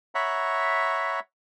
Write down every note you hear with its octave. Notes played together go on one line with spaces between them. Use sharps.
C#5 E5 F#5 A#5 B5